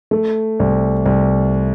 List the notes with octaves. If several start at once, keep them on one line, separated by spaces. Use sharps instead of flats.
A3
C2
C2